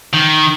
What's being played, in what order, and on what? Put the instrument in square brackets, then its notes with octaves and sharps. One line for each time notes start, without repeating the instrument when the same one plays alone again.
[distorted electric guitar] D#3